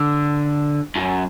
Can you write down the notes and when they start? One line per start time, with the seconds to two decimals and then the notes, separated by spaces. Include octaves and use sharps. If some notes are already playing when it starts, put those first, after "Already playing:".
Already playing: D3
0.96 F#2